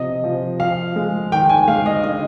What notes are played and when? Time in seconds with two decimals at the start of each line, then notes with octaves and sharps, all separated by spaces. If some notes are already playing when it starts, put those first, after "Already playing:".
Already playing: C3 F3 D#5
0.24 F3
0.59 F3 F5
0.96 G#3
1.32 D#3 G5
1.49 G#5
1.68 G#3 F5
1.86 D#5
2.04 D3 D#5